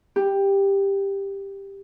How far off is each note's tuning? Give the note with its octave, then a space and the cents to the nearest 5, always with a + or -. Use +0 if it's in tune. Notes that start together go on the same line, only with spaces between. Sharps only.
G4 +10